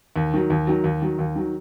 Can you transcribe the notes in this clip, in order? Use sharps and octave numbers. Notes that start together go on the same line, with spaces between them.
D#2
D#3 F#3
D#2
D#3 F#3
D#2
D#3 F#3
D#2
D#3 F#3